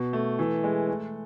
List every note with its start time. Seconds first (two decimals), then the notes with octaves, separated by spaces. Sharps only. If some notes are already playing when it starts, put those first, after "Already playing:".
Already playing: B2
0.13 A3
0.39 E3
0.64 G#3
0.88 A3